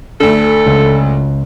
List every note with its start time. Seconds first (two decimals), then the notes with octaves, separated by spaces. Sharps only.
0.20 D2 D3 A4
0.66 C#2